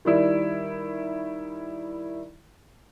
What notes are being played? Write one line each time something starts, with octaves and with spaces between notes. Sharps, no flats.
D#3 G3 E4